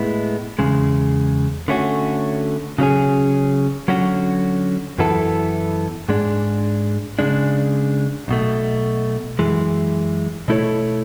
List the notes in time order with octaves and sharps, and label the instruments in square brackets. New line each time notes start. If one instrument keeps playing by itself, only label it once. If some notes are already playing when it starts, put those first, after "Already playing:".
Already playing: [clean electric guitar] A2 G#3 B3 E4
E2 C#3 G#3
D3 A3 C#4 F#4
C#3 F#3 C#4 G#4
D3 F#3 C#4 F#4
F#2 E3 B3 E4 A4
G#2 G#3 D4
C#3 G#3 D4
B1 B2 A3
F#2 E3 G#3
B2 A3 E4 A4 C#5